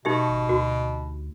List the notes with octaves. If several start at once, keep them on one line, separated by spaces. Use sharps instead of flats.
B2 D#4 G4 E5
G#1
D2 F#4